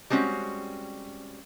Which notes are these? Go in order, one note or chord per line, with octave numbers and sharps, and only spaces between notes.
G3 G#3 C4 C#4 F#4